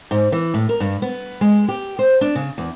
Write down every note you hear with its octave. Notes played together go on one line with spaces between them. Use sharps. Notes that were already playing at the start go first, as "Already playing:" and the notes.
G#2
E3
A2
A#4
G2
B3
G#3
G4
C5
D4
C#3
E2